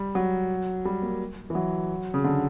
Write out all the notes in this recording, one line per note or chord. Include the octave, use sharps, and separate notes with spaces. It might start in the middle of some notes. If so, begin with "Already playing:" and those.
Already playing: G3
F#3
G3
A#3
E3
F#3
C#3
D3